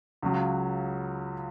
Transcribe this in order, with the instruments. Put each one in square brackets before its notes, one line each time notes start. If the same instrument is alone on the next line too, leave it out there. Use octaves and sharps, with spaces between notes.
[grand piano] C#2 C#3 F#3